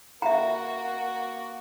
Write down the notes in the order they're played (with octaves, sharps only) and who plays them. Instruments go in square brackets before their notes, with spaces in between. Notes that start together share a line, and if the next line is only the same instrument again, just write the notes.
[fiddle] A#3 F#4 [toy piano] E5 A#5